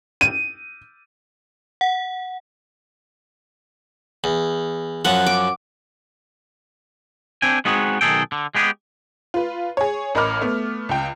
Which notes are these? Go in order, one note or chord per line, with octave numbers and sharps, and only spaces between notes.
D#7
F#5
E2
F#2 F3 F#5
D6
C4 D4 G5 G#5
G#3 B3 C4 D#4 F#4 G#4
B1 D#3 A#3 G#4 A4 G5
D3
G#3 B3 G4 G#4
F4 B4
G#4 C#5
A1 A#4 D#5 B5 D6 F6
A3 B3
C#2 G5